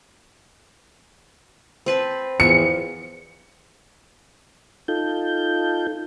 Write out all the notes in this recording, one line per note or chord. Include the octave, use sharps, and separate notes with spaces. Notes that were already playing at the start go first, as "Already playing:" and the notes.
C4 B4 A5
E2 F3 C#7
D#4 F4 A4 G6